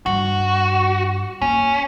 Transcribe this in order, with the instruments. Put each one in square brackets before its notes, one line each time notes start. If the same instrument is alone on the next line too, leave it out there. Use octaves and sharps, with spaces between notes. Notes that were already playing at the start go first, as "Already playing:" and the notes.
[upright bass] G2 [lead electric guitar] F#4
[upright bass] A#3 [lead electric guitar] C#4